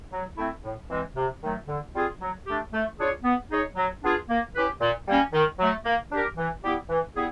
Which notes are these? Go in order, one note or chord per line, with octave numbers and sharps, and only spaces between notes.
F#3
A3 C4 E4
A2
E3 G#3 C4
C3
D#3 F#3 A3
D3
G3 C4 F4 G#4
F#3
A3 D4 G4
A3
D4 F4 G#4 C#5
B3
D#4 G#4 C#5
F#3
B3 D4 F4 G#4
A#3
C#4 E4 G4 B4
A#2
G3 A#3 C#4
D#3
F#3 A3
A#3
D4 G4 A#4
E3
G3 B3 E4 G4
E3
G3 B3 E4 G#4